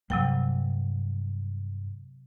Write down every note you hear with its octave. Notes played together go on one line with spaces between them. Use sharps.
G2 C3 F#3 G3 A#3 G5